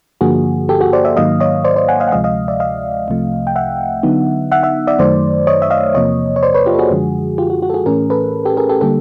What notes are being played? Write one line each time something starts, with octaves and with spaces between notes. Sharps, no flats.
G2 D3 F3 A#3 F#4 G#4
G4 A4
F#4 G#4
C5 D5
D5 E5
G#2 D#3 F#3 A#3 D#5 F5
C#5 D#5
C5 D5
C5 D5
F#5 G#5
D#5 F5
F#5
D2 C3 F3 G#3 D#5 F5
D#5 F5
D5 E5
D#5 F5
C2 C3 F3 A3
G5
E5 F#5
D3 F#3 B3 D#4
E5 F#5
E5 F#5
D5 E5
F#2 D#3 F#3 A3 C5 D5
C#5 D#5
E5
D#5 F5
E2 C3 F3 A#3 C#5 D#5
C#5
C5 D5
B4 C#5
F4 G4
A4
F#4 G#4
F#2 D3 F3 G#3
F4 G4
F#4
F#4
A4
F#4 G#4
A2 E3 A3 C#4 G#4 A#4
A4 B4
G4 A4
G#4 A#4
G4 A4
D3 G3 A#3 G4 A4